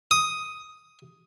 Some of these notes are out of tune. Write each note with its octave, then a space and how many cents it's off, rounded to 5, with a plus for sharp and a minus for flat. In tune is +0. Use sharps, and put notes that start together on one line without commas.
D#6 +5